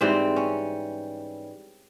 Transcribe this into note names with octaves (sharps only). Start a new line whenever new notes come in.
G#2 E3 G3 C4
C#4